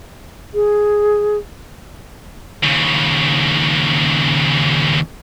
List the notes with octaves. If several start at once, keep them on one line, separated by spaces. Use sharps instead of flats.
G#4
D#2 C#3